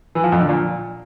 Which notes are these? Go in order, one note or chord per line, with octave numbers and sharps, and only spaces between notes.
E3
F3
F2
D3
A#2